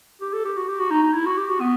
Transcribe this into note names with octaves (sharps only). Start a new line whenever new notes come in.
G4
A4
G4
F#4
G4
F#4
D#4
D#4
E4
F#4
G4
F#4
B3